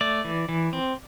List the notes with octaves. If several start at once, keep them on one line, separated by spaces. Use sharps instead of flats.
A3 D5
E3
E3
C4